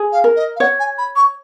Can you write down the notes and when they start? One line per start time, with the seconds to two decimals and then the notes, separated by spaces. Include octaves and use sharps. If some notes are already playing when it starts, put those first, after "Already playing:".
Already playing: G#4
0.12 F5
0.24 A#4
0.36 D#5
0.56 F5
0.60 C#5 F#5
0.79 G#5
0.98 B5
1.16 C#6